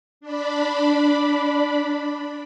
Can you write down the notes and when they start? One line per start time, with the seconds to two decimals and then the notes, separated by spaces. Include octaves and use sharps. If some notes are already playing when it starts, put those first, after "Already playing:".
0.21 D4 D5 B5